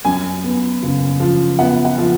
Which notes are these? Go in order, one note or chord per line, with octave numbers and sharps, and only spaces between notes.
F#2 G#5
B3
F#1
F3
B3 F#5
F#5
F3